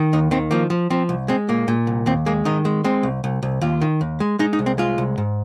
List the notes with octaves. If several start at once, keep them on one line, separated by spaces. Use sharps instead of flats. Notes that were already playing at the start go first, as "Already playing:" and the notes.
Already playing: D#3
D#2 D#4
D#3 C4
F3 A#3
F3
F3 C4
C2
G#3 C4
A#2 A#3
A#2
C2
D#2 C4
G#3 A#3
D#3 D#4
G#3
G#3 C4
C2
C2
C2
D#2 F4
D#3
D#2
G#3
G#3 D#4
D#4
C2
C4
G#3 F4
C2
G#2